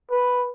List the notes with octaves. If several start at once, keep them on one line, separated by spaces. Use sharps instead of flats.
B4